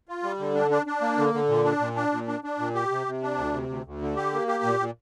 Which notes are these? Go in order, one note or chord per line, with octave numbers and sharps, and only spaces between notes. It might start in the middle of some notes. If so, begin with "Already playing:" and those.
F4
G3
D3
D4
D4
D4
A#3
D3
D3
A#2
D4
A#2
D4
A#2
D4
D4
A#2
G4
C3
C3
D4
D2
C3
D2
D2
D3
G4
A#3
G4
A#2
A#2